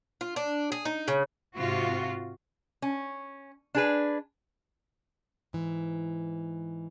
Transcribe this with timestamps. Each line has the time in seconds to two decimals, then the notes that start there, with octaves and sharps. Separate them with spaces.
0.21 F4
0.36 D4
0.72 G#4
0.85 D#4
1.08 C#3
1.57 G#2 C3 F4 F#4
2.82 C#4
3.75 D4 G#4 B4
5.53 G#2 E3